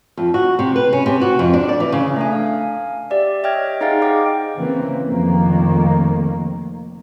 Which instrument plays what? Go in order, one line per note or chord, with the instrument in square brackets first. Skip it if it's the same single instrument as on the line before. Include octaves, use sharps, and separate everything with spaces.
[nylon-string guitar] F2
F#4
C3
B4
C#4
C3
F#4
F2
D4
D5
E3
C#3
[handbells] A3 D4 G#5
F5
G4 D5 E5
C#5 D#5 E5 G5 F6 G#6
D#4 G#4 C5 F5 F#5 A6
D#5 F5 G5 D6
[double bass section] C#3 E3 A#3 C4
F1 F2 D#3 A#3